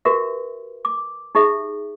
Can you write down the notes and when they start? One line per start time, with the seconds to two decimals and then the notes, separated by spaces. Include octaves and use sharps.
0.05 F#4 G4 A#4 B4 E5
0.85 D6
1.35 D#4 G4 G#4 E5